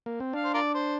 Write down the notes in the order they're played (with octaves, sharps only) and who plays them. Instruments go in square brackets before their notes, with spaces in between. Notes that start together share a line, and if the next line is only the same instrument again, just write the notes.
[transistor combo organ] A#3
C4
[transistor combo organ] D4 [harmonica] F5
[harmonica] C5
F4 A#4 D5
C5